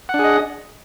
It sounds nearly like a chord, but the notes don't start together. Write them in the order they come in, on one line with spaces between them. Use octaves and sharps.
F#5 D4 G#4 D#5